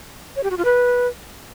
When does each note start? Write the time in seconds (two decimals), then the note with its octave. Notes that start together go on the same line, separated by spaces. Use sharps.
0.36 C#5
0.43 G4
0.50 F#4
0.58 F4
0.65 B4